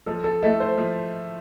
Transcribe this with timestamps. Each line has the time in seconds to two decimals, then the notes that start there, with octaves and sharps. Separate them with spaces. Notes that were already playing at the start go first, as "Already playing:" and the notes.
0.06 F3 A4
0.24 A4
0.42 A3 E4 A4
0.60 C5
0.78 F3